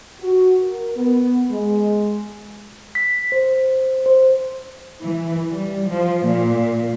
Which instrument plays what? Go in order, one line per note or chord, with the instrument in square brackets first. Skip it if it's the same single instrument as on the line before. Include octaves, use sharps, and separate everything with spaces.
[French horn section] F#4
A#4
B3
G#3
[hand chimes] B6
C5
C5
[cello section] E3
G3
F3
A#2